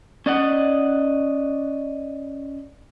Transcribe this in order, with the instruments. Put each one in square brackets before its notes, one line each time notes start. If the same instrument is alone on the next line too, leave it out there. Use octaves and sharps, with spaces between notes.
[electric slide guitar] C#4 D5 D#5 F#5